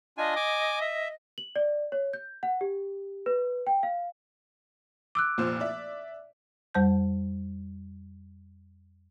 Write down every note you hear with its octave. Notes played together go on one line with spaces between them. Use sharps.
D4 F4 D#5 G#5
G#5 D6
E5
F#7
D5
C#5
G6
F#5
G4
B4
G5
F5
D6 E6 F#6 D7
F1 A#2 C5
D5 E5
F2 G3 C5 A5 G6